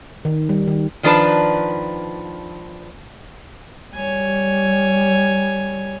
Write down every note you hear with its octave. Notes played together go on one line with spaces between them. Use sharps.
D#3
G3
D#3
D#3 F3 D4 B4 A5
G3 C#5 G#5